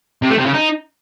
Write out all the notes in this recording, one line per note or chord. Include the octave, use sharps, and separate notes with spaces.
C3
A3
C3
C#3
D#4